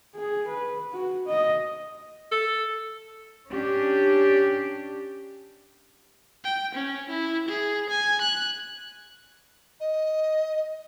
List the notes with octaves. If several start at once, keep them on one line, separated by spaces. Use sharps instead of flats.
G#4
B4
F#4
D#5
A4
C#4 D4 G4
G5
C#4
E4
G#4
G#5
F#6
D#5